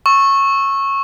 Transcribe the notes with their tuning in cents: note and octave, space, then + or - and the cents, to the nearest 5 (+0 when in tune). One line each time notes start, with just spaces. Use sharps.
C#6 -15 E6 +0